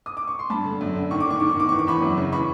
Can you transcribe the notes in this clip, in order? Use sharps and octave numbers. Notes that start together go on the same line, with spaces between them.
D#6
D6
C#6
C6
G2 A5 B5
D3
F#2
D3
D#3 C#6
D6
D#3 C#6
D#3 D6
C#6
D#3 D6
E3 C#6
D6
E2 B5 C#6
F#2
C#3
E3 B5 C#6